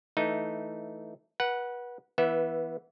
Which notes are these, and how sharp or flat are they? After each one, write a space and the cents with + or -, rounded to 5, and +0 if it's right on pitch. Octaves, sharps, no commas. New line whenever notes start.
E3 -10 A3 +0 D#4 +0
B4 -30 F#5 +0
E3 +0 B3 -15 E5 +0